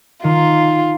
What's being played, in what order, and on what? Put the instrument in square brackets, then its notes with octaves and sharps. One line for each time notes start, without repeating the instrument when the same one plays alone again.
[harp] D#3 [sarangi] F4